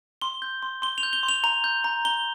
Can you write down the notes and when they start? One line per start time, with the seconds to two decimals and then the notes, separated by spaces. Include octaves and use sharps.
0.21 C6 G7
0.42 G6
0.63 C6
0.82 C6 G7
0.98 F7
1.03 G6
1.13 G7
1.23 C6
1.29 F7
1.44 A#5 F7
1.64 G6
1.84 A#5
2.05 A#5 G7